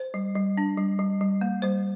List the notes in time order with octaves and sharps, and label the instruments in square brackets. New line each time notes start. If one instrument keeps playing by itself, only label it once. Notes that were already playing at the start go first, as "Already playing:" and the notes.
Already playing: [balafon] C5
G3
G3
D4
G3
G3
G3
A#3
G3 C5